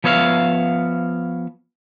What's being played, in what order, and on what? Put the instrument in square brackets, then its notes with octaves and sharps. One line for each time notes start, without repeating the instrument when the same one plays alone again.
[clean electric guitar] F3 B3 C#5 E5 F5